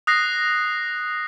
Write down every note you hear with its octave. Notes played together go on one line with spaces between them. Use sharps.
D#6 F#6 A#6 C7